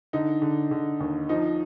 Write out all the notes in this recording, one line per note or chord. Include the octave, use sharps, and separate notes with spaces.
D3 D#4
D3
D3
D#2
F3 D#4